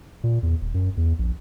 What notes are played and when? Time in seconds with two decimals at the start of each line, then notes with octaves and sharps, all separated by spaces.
0.24 A#2
0.43 E2
0.61 D#1
0.74 F#2
0.97 E2
1.19 A#1